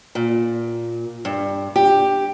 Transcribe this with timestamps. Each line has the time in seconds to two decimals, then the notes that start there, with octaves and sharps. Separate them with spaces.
0.15 A#2
1.25 G2
1.76 G4